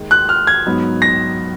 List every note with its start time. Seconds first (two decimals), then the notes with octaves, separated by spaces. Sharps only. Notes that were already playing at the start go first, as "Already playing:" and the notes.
Already playing: D#2 D#3 G#3
0.11 F#6
0.29 F6
0.47 G#6
0.66 G#2 F#3 B3 D#4
1.02 A#6